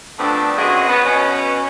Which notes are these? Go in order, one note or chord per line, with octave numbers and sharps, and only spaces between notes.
F3 A3 B3 C4 D4
F#2 B2 C4 F#4 G#4 D#5
B3
B2 C#4 B4